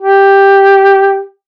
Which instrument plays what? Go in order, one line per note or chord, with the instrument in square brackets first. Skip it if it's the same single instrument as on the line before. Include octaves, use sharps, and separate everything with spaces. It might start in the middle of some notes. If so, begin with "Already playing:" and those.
[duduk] G4